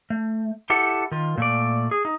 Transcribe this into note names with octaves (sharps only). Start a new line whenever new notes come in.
A3
E4 G4 A4 E5 F#5
D#3 F4
A#2 A3 D5
G#4
D#4